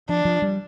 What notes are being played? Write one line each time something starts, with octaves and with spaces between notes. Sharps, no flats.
F3 D4
F3
G3